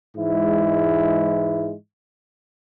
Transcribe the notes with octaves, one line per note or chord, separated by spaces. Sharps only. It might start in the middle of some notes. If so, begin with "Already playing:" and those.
G#2 E3 G#3 E4